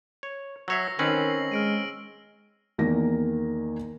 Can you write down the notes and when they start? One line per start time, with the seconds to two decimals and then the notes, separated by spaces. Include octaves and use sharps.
0.23 C#5
0.68 F#3 C#5 E5 E6 A#6 C7
0.99 D#3 C4 C#4 B4 F#7
1.52 G#3 F6 D7 D#7
2.78 E2 D#3 A#3 A#6